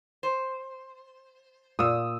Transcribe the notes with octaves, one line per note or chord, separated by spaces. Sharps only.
C5
A#2 D#6 E6